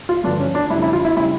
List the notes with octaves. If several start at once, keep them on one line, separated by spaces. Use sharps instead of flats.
F4
G2 D3 F3 D4
C#4
D4
F2 C#3 G3 E4
E4
F4
E4
C#3 G3 E4